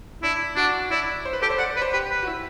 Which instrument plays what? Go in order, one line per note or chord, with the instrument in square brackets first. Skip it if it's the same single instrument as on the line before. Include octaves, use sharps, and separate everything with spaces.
[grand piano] D4 [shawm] E4
[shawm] D4 [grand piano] F#4
[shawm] E4 [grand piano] D5
[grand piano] C5
B4
[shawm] G4 [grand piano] A4
[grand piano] C5
[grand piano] D5 [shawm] F#5
[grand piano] D5
[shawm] B4
[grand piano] C5
[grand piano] G4 [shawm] B4
[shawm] B4
[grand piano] F#4
E4